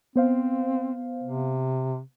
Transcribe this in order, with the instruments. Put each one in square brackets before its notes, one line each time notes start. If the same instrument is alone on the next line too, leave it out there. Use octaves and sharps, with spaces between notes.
[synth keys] B3 C5 F5 [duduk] C4
[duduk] C3